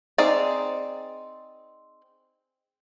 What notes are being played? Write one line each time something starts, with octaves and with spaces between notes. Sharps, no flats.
C4 D#4 G#4 D5